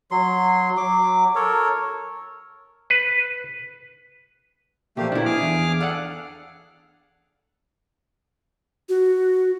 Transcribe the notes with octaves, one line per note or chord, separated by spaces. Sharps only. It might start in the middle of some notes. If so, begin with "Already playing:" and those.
F#3 C6
F#3 D6
A4 A#4 C#5
B4
A#2 F3 A3 A#3 G4
G2 B2 D3 D4 E4
G#4 D6 F6
E2
D4 A4 F5 F#5
F#4